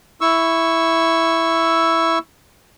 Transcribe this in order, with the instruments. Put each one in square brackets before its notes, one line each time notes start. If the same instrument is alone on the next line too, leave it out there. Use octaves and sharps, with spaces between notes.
[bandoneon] E4 C#6 E6